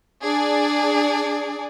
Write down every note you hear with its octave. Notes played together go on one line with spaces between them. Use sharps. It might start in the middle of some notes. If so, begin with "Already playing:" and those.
D4 G#4 D5